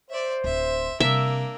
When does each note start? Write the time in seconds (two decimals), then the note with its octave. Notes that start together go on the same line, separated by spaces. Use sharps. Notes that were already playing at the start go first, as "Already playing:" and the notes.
0.11 C5 D5 E5
0.44 D1 E5
1.00 C3 G3 A#3 D4 E5